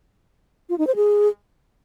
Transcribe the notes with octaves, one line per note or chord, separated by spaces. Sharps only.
F4
D#4
C5
G#4